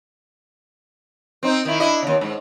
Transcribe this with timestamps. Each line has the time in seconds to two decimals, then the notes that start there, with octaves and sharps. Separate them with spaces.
1.43 C4 D#4
1.65 D#3 E4
1.80 D4 E4 D#5
2.02 D#2 C#3
2.21 G#2